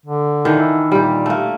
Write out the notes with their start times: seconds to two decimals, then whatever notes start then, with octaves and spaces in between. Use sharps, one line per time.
0.06 D3
0.45 D#3 E3 D4
0.60 E4
0.92 A#2 G3 G4
1.26 A3 A#3